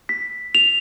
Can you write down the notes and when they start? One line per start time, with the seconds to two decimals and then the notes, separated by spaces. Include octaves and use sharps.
0.09 B6
0.55 F7